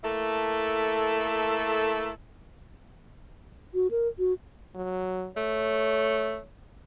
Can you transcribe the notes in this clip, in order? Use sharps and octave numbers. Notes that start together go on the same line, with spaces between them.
A3 A#3 E4 A4
F#4
A#4
F#4
F#3
A3 C#5